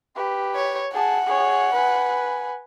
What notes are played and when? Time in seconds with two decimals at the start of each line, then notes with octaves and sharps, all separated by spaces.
0.16 G4 B4
0.56 C#5
0.94 G#4 F#5 A5
1.26 G#4 C#5
1.73 B4 G#5